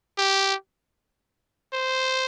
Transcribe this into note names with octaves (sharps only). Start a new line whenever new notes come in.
G4
C5